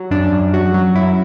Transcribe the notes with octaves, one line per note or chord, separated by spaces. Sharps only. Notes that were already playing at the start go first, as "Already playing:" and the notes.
Already playing: F#3
F#2 D4
F#2
F#3 F#4
F#3
F#2 E4